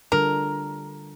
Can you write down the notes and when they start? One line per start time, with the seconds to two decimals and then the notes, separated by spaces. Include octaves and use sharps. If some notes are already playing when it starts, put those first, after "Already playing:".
0.12 D3 G3 D4 F4 A4 A#4